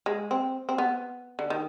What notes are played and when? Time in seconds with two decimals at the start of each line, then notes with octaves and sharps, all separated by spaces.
0.06 G#3
0.31 C4
0.69 C4
0.78 B3
1.39 D3
1.50 D#3